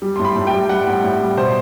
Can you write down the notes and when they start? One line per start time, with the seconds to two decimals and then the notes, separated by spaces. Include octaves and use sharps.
0.02 G3
0.16 A2 C6
0.25 B5
0.36 A2
0.47 G5
0.53 G3
0.69 G3 F#5
0.87 A2
1.04 A2
1.21 G3
1.37 B2 C5